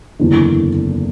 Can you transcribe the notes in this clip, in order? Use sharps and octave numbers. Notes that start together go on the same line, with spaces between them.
F#1 E2 D3